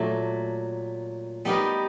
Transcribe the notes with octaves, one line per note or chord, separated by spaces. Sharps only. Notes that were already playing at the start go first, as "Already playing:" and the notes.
Already playing: A#2 F#3 A3
G3 B3 D#4 G4 A#4